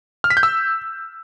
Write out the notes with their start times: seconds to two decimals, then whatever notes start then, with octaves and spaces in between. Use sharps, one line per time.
0.24 F6
0.30 B6
0.37 G6
0.43 E6